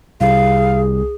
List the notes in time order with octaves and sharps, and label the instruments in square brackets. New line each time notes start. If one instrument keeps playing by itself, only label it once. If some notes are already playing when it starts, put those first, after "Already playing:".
[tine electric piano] C2 [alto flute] G#4 [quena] F5